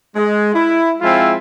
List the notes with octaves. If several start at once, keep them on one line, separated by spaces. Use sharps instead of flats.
G#3
E4
F3 G#3 C4 E4 F4